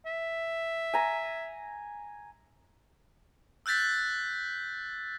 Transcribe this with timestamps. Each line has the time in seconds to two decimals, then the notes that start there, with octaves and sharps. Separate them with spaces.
0.06 E5
0.94 G#5 A#5
3.66 E6 F#6 G6 A6 B6